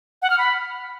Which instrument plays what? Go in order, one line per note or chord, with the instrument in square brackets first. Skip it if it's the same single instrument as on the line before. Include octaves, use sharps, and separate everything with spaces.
[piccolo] F#5
F6
B5